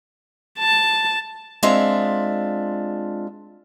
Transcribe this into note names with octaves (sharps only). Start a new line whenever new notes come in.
A5
G#3 C4 D4 F4 E5